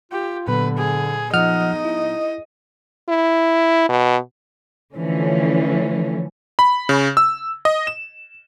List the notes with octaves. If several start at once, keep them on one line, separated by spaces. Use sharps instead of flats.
F4 G4
A#2 D3 F#3 B3 B4
G#4
F3 D#4 D#5 F#5 F6
E4
E4
B2
D3 E3 F3 A3 C#4
B5
C#3
E6
D#5
E7